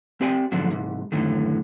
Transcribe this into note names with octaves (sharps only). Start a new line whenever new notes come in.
C4 G4 D5 G5 G#5
F2 G#2 D3 F3 F#3
C2 G#2
F#2 A2 D3 D#3